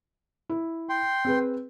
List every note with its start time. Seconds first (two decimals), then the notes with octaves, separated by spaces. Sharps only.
0.49 E4
0.89 G5 C6
1.25 C4 G#4 B4